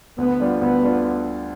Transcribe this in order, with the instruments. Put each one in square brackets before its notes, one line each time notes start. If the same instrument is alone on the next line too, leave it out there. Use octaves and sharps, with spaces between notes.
[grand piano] D2 [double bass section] B3
[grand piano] D3 G3 D4 F4
[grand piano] D2 [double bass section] B3
[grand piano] D3 G3 D4 F4